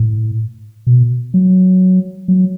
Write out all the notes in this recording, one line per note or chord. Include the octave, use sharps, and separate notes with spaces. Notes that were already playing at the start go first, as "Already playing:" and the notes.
Already playing: A2
B2
F#3
F#3